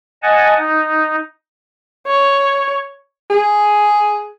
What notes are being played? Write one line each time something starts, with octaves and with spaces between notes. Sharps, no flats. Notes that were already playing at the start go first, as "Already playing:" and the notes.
D#5 F#5 G#5 A5
D#4
C#5
G#4